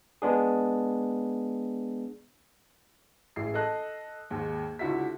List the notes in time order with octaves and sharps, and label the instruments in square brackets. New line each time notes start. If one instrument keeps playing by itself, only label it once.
[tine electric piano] G#3 B3 D4 G#4
[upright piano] A1 G#3 C7
A4 D#5 F#6
D#2 G#2
C#2 D3 E4 F#4 E5 B6